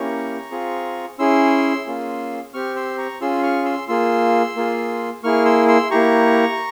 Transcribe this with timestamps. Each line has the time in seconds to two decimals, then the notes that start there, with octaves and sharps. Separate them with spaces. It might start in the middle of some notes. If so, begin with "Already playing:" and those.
Already playing: A#3 C#4 E4 G4 A#5 C#6
0.51 C4 F4 G#4
1.19 C#4 E4 G#4 C6 E6
1.86 A#3 C#4 F4 G#4
2.54 C4 G4 C#6 F6
2.76 C6 E6
2.98 A#5 C#6
3.21 C#4 F4 G#4 C6 E6
3.43 C#6 F6
3.65 C6 E6
3.88 A#3 F4 G#4 C6 E6
4.56 A#3 F4 G#4
5.23 A#3 E4 G#4 C#6 F6
5.45 C6 E6
5.68 C6 E6
5.91 A#3 E4 G4 A#5 C#6